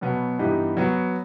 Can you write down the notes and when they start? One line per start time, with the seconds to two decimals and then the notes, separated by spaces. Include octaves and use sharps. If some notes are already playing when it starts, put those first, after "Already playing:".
0.01 B2 F#3 B3
0.39 G2 E3 B3 D#4 G4
0.77 F#3 B3 F#4